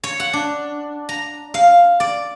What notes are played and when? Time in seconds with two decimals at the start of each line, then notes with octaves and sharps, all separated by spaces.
0.04 C#5
0.20 F#5
0.33 D4
1.09 A#5
1.54 F5
2.00 D5